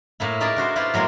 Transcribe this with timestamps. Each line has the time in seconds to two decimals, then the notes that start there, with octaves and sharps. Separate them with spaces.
0.20 A2 A#3 E4
0.40 D#4 G#4 A#4 D5 A5 B5
0.56 D4 F#4 C5
0.76 E4 F4 B4 C5 D5
0.94 A2 F#3 G#3 A#3